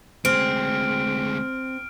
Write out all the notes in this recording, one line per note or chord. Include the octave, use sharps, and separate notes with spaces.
D2 G#3 C4 F6 D7